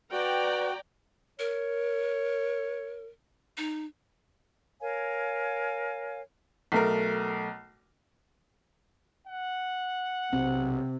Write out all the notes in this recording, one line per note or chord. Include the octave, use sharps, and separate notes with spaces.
F#4 B4 D5 G5 A#5
A#4 C#5
D#4
A#4 C#5 F5 G#5
B1 A3 A#4
F#5
B1 C3 C4